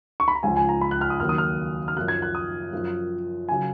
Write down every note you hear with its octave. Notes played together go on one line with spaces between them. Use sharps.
C#6
B5
A#5
C#2 C#3 F3 G#5
G#5
A#5
B5
F#6
F6
D#6
D#2 D#3 F#3 F6
D#6
F6
F6
F#2 F3 F#6
G#6
F#6
D#6
F#2 F3
C#3 F#3 G#5